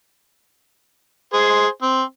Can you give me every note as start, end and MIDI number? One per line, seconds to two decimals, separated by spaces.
1.33 1.67 68
1.33 1.67 72
1.82 2.02 60